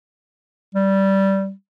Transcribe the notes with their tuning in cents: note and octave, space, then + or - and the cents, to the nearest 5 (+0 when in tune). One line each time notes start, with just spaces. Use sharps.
G3 -15